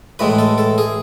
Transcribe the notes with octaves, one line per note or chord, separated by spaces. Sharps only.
A2 E3 G#3 B4
A4
A4
G#4